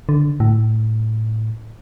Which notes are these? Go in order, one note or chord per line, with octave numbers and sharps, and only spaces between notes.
D3
A2